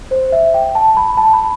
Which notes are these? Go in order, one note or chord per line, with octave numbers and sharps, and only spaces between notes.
C5
E5
G5
A5
B5
A5
B5